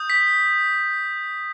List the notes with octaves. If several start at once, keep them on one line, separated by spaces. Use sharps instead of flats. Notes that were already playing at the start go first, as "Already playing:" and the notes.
Already playing: D#6 G6
B6